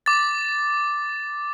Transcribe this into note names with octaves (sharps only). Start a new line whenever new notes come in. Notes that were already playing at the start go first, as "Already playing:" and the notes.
D6 A6